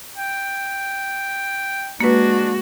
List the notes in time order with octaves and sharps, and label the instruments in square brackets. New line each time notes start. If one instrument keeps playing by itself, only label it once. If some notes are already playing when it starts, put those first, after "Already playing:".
[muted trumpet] G5
[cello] G#3 F#4 [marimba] A#3 B4 [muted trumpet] D4